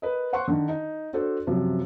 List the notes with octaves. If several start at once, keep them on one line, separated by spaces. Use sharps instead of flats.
A#4 B4 D#5
C5 F#5 C6 C#6
D3 D#3
D#4
D4 F#4 A4 C5 D5
F#2 C3 F3 F#3